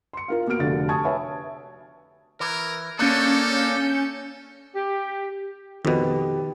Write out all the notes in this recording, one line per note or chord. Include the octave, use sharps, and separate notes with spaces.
C6 C#7
F4 A#4 F5
A#3 B3 F#4 F6 D7
F1 D3 F#4 G4 A6
G#5 A5 C#6 D#6 G#6
B4 C#5 E5 G#5 A5
E3 A#4
A#3 C#4 D4 A4 C#5 G6 C#7
G4
F2 B2 D#3 G4 B4